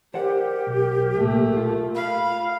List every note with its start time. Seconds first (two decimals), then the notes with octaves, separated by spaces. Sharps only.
0.14 G4 A#4 C5 D5 F#5
0.67 B1
1.17 C2 A#2 A3
1.57 F4
1.96 F5 B5